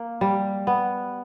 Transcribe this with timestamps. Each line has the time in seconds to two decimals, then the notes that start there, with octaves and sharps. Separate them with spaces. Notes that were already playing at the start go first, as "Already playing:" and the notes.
Already playing: A#3
0.21 G3
0.67 B3